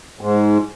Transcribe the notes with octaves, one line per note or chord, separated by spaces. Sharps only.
G#2